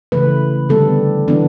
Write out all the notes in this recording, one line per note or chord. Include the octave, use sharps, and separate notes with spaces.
C#3 E3 A3 B4
D3 G3 B3 A4
E3 B3 D4